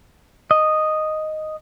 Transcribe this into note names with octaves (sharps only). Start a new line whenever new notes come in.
D#5